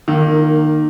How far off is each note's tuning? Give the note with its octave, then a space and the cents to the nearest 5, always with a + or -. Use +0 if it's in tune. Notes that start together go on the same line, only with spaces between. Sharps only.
D#3 -25 A#3 +0